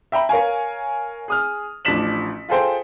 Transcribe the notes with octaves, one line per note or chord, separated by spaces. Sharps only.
E5 G5 A#5 B5
A#4 C#5 F5 G#5
G#4 D#6 F6
A1 F3 D4 B6 E7 F#7
F4 G#4 A4 C5 G5